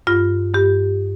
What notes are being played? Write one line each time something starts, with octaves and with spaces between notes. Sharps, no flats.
G2 F4
G2 G4